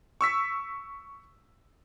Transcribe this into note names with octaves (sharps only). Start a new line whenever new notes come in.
C#6 E6 B6